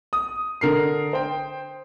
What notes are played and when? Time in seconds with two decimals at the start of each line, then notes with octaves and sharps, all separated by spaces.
0.13 D#6
0.61 D3 A#4 C7
1.13 C5 G5